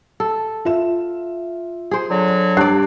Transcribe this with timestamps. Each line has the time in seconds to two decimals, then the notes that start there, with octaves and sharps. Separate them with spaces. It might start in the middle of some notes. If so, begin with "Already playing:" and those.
0.20 A4
0.65 F4 E5 E7
1.91 G#4 C5
2.10 D3 F#3
2.57 G2 D5 F#6 C7